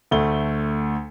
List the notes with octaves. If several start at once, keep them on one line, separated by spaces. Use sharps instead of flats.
D2 A3 G7